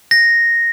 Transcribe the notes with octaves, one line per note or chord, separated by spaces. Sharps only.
A#6